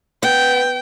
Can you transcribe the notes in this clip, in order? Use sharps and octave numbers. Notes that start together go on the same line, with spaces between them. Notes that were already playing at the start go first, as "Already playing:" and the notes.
B3 G5